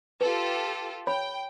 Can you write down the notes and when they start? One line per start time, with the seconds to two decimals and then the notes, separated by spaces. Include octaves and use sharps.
0.21 F4 G4 A4 B4
1.07 C#5 G5 B5